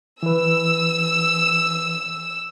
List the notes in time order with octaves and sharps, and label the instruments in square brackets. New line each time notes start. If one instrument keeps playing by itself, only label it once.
[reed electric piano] E3 B4 [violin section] E6